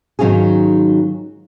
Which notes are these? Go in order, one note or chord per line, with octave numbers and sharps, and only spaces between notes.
G#2 D#3 F#3 C#4 F4 G#4